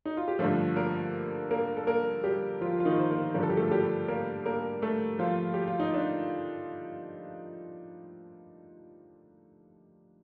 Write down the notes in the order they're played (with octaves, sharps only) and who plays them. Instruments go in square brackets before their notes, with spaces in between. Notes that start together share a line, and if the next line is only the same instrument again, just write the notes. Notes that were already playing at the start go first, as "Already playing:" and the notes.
[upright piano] D#4
F4
G4
G2 D3 F3 A3 A4
A#3 A#4
A#3 A#4
A4
A#3 A#4
G3 G4
F3 F4
F4
D#3 D#4
C5
A#3 A#4
G2 D3 F3 A#4
A4
G4
A3 A4
A4
G3 G4
A#3 A#4
A#3 A#4
A3 A4
F3 F4
G4
F4
D#4
D4